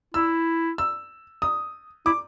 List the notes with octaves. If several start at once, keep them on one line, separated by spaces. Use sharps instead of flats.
E4 E6
E6
D#6
E4 D6